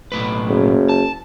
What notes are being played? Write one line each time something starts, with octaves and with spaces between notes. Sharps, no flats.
B1 A2 B4
F#1
A5